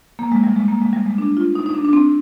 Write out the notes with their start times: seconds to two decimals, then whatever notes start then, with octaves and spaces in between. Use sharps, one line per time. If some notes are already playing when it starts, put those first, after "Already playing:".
0.19 A#3
0.32 G#3
0.43 G3
0.56 G#3
0.68 A#3
0.81 G#3
0.93 G3
1.06 G#3
1.18 D4
1.37 F4
1.55 D#4
1.66 D#4
1.75 D4
1.85 D4
1.93 C4